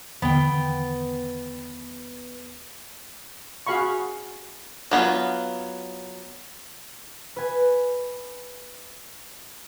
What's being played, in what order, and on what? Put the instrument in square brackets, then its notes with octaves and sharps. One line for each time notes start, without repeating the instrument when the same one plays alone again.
[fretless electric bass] E2 D3 D#3 [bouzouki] B3 G5
[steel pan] F#4 G#4 F5 B5 C#6
[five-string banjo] F#3 B3 F4
[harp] B4 G#5